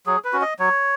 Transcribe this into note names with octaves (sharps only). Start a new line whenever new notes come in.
F#3 G#4
B4
C#4 F#4
D#5
F#3 C#5